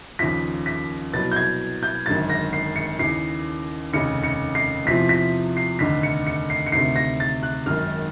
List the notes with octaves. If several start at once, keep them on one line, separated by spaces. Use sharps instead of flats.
D#2 C#3 F3 B6
B6
C2 B2 F#3 A6
G6
G#6
G6
G#1 F#2 D3 F#3 A6
A#6
C7
C#7
D#2 C#3 E3 C7
F1 D#2 C#3 C#7
C#7
C7
E2 C3 F3 B6
B6
C7
F1 D#2 D3 B6
C#7
C#7
C7
C#7
D2 C3 D#3 C7
A#6
A6
F#6
G#1 F#2 D#3 F6